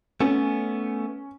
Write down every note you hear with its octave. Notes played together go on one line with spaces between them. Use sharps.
A3 B3 C#4